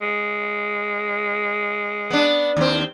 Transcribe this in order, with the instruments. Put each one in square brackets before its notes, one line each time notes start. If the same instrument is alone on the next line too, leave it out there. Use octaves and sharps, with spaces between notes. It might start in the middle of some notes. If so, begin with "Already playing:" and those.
[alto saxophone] G#3
[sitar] B3 D4
D#2 C4